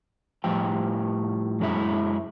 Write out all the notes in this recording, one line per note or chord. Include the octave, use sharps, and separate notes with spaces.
A2 F3 G3 F4 G5
F#2 F#3 G#3 E4